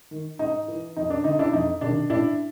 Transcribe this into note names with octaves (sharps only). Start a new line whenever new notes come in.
D#3
G#2 D#4
E3
F2 D#4
D4
D3 D#4
D4 E4
F2 D#4
C3 D#3 D4
A2 D4 E4